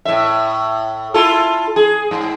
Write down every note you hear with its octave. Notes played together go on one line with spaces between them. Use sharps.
A2 E5
E4 F4 A4
G#4
G#2